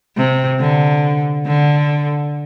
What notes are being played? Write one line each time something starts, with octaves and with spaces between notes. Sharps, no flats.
C3
D3
D3